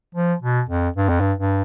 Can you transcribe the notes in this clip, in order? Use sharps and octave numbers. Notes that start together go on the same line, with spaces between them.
F3
B2
F2
G2
F2
G2
G2